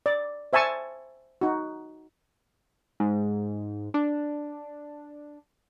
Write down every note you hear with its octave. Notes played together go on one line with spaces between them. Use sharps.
D5
C5 E5 G#5 A5 C#6
D#4 F#4
G#2
D4